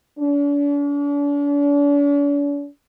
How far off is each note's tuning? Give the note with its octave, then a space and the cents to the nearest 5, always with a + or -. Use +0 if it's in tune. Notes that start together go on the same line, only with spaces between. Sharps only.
D4 -45